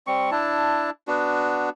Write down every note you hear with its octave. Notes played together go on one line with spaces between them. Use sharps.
G3 C4 C#6
D4 E4 A5
B3 D4 F#4